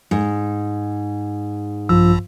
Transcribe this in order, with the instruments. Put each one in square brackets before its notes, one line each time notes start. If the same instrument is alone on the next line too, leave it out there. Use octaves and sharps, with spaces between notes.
[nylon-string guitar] G#2
[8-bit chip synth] A#1 [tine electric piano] G2 E6 [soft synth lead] F3